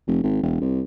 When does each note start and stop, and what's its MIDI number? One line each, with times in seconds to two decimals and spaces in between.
0.07 0.21 29
0.23 0.43 32
0.43 0.58 28
0.61 0.82 36